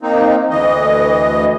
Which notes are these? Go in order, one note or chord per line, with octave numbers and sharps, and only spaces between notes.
A#3 C4 D#4
D2 E3 D#5